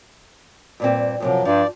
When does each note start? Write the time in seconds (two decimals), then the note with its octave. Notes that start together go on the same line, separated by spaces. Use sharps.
0.80 G2 A#2 C4
1.20 F#2 A2 C3 F3 F#3
1.45 G2 F3 D5